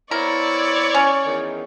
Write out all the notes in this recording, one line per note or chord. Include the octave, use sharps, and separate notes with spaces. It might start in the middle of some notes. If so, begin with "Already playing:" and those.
B3 C4 E4 A#4 C#5 D5
C#4
E2 D#3